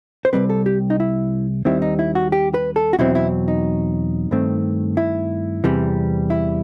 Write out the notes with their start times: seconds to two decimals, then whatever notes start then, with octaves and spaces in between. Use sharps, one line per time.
0.25 C5
0.33 C2 B2 G3 C4 B4
0.49 A4
0.66 G4
0.90 D#4
1.00 E4
1.65 D#2 D#3 G3 C4 E4
1.82 D#4
1.99 E4
2.15 F#4
2.32 G4
2.54 B4
2.76 A4
2.93 F#4
2.99 E2 B2 F#3 C4 E4
3.15 E4
3.48 D#4
4.31 G2 D#3 A3 C4
4.97 E4
5.64 E2 C3 E3 G3
6.30 E4